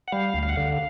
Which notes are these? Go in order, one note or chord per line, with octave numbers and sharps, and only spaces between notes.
F#5
G3 F5
D2
F5
F#5
D3 F5
F5